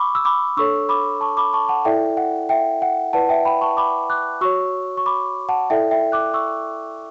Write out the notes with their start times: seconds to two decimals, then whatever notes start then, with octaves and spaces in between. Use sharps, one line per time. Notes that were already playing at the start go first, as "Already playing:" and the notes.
Already playing: B5 C#6 D6 E6
0.15 E6
0.25 B5 D6
0.57 D4 A4 C#5 C#6 E6
0.89 B5 D6
1.21 A5 C#6
1.37 B5 D6
1.53 A5 C#6
1.69 F#5 A5
1.85 E4 A4 D5 E5 G5
2.17 F#5
2.49 E5 G5
2.82 F#5
3.13 E4 B4 D5 F#5 A5
3.29 E5 G5
3.45 G5 B5
3.61 A5 C#6
3.77 B5 D6
4.10 D6 F#6
4.41 F#4 C#5 C#6 E6
4.97 C#6
5.06 B5 D6
5.49 F#5 A5
5.70 E4 A4 D5 E5 G5
5.91 E5 G5
6.12 D6 F#6
6.34 C#6 E6